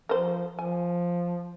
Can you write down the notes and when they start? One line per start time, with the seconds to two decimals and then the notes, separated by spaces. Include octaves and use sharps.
0.09 F3 A#4 C5
0.59 F3 G#5